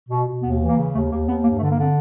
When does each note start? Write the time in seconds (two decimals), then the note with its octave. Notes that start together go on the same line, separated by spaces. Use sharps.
0.09 B2
0.25 B2
0.42 D#2 B3
0.59 E3
0.68 A#3
0.76 C#3
0.93 D#2 A3
1.10 D#2 A#3
1.27 D#2 B3
1.44 G2 A#3
1.57 A3
1.61 D3
1.70 A#3
1.78 D3 C4